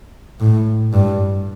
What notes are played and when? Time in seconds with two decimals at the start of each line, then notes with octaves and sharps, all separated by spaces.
0.40 A2
0.93 G2